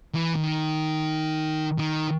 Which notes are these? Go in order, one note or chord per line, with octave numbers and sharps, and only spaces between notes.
E3
D#3
D#3